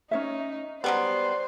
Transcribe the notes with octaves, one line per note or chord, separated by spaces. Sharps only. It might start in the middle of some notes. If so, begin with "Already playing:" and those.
C#4 D#4 C#5 E5
F#3 G3 B3 G4 B4 C5 D5